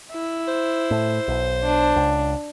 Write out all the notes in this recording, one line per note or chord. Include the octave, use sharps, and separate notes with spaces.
E4
C5
A2
B1
D4
C#2